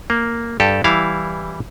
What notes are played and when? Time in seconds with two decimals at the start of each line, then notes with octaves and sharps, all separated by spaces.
0.10 A#3
0.60 G2 G4 A4
0.84 E3 G3 E4 F5